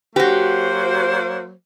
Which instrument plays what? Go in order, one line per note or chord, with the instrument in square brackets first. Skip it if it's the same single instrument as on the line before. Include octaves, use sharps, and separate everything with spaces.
[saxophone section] F#3 A#3 C5 [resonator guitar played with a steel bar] F#4 G4